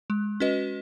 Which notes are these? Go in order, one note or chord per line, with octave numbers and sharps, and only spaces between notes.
G#3
C#4 F#4 B4 D#5